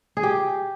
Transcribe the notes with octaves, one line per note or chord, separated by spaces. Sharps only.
G#4
G4